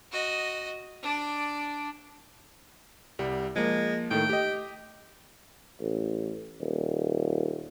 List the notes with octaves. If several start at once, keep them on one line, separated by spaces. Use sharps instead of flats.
F#4 D#5
D4 D5
C2 G3 F#5
F3 G#3 A#3
A2 D#3 A3 G5
G4 D#5
A1
D#1